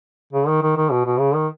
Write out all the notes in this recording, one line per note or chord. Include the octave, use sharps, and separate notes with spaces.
C#3
D#3
D#3
D#3
B2
B2
C#3
D#3